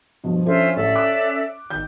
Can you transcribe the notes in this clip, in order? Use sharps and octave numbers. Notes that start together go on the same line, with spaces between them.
G2 B2 F3
F3 C#4 D4 F4 A4 C5 E5
A1 A4 D5 E5
D6 F#6
G1 D#3 G6